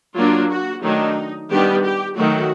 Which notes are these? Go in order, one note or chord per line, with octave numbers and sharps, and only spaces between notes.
F#3 A#3 D4 F4
F#4
D#3 F#3 A3 D4 D#4
D#3 G3 B3 D4 G4
G4
D#3 F#3 A3 F#4